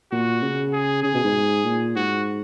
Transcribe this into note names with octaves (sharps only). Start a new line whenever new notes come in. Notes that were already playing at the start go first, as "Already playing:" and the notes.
A#2 F#4
C#3
G#4
C#3 G#4
B2
G#2
A#2
G#2 F#4